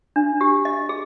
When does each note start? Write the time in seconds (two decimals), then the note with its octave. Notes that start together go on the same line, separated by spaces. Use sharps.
0.16 D4
0.41 G4
0.65 D#5
0.89 G#4